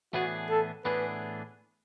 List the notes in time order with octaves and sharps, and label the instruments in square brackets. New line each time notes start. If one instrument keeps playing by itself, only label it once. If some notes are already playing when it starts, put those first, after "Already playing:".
[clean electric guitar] A2 E3 B3 D4 G#4 [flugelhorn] F#4
[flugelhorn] A4
[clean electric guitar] A2 E3 B3 D4 G#4 [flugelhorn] B4